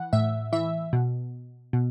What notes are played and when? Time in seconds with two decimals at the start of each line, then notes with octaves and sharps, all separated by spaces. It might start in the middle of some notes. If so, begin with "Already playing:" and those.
Already playing: E3 F#5
0.13 A2 E5
0.52 E3 E5
0.93 B2
1.73 B2